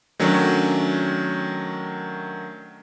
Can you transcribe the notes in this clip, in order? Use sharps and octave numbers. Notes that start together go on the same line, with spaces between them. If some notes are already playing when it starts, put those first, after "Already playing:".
D#3 F#3 A3 C#4 D4